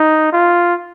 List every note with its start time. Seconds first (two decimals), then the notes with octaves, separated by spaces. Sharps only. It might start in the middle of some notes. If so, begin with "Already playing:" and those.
Already playing: D#4
0.33 F4